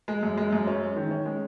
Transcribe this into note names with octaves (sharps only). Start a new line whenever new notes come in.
G#3
F#2
G#3
F#2
C#4
G#3
D#3
C#4
G#3